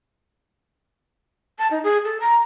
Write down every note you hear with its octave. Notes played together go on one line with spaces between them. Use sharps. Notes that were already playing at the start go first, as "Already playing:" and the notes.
A5
D#4
G#4
A4
A#5